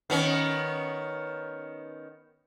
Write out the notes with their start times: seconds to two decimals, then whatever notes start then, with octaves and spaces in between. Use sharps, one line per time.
0.10 D#3 B3 C#4